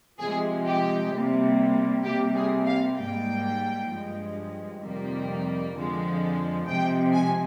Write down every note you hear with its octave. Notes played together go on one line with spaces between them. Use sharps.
C3 F3 G#3 G#4
G4
C3 G3 A#3
C3 G3 A#3 G4
G#4
F5
G#2 G3 A#3 G5
G2 F3 G#3
F2 C3 D#3 G3 A#3
F2 D3 F3 G#3
C3 F3 G#3 G5
G#5